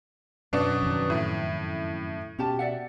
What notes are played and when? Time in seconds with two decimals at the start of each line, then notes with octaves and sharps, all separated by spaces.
0.53 F#2 B2 C#4 D4 F#5
0.82 F2 D#3
1.10 A2
2.39 B2 C#4 G4 A5
2.59 D5 E5 F#5